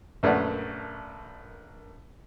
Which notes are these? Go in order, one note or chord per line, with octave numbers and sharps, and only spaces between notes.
A#1 F#2 A3 B4 D5 F#5